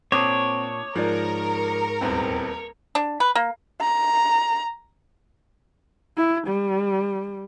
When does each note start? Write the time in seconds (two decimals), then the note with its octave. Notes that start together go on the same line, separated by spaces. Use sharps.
0.12 A#2 C4 D4 C#5 D6 D#6
0.96 G#2 F3 A#4 D5
2.01 D#1 E2 C4
2.95 D4
3.20 B4
3.35 A#3
3.81 A#5
6.17 E4
6.47 G3